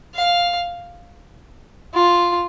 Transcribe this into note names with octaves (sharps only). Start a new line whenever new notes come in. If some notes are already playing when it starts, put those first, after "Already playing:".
F5
F4